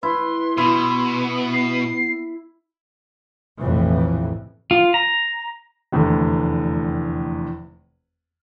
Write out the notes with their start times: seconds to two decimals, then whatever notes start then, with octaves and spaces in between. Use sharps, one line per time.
0.03 E4 B4 C6
0.58 B2 B3 E4
1.53 C7
3.59 A#1 F2 A2 C3 E3
4.71 F4
4.94 A#5
5.92 F1 E2 A2 D3